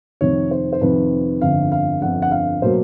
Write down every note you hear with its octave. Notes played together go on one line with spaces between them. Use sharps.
F2 C3 D#3 C#5
C5
C5
F2 C3 D#3 B4
G1 F2 D3 F5
F5
G1 F2 D3 F#5
F#5
F5
B2 F#3 A#3 C5